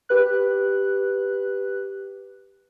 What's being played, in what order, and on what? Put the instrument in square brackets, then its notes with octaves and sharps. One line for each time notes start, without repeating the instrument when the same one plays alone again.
[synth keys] G4 B4 F#6